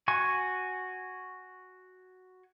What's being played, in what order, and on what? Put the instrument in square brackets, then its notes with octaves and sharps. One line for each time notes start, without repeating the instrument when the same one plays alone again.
[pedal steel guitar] F#4 G#5 C#6